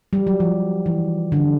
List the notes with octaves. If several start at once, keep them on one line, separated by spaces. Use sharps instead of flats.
G3
F#3
F3
E3
D3